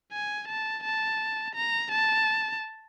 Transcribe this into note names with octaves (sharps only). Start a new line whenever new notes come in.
G#5
A5
A5
A#5
A5